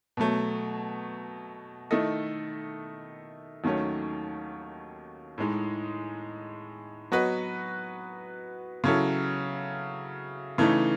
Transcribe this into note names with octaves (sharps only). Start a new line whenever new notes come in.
B2 F#3 A3
D#3 A3 E4 A4 D#5
D#2 D#3 F#3 A3 C#4
A2 G#3 D#4
F#3 B3 F#4 B4 D#5
C#3 F#3 C#4 E4 A4
C#3 E3 A3 D#4